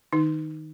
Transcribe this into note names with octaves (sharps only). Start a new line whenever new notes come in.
D#3 D#4